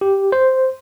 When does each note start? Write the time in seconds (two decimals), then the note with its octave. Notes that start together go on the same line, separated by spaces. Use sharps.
0.01 G4
0.32 C5